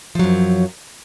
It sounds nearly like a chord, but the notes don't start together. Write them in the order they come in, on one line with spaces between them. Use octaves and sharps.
F3 F#3 F#2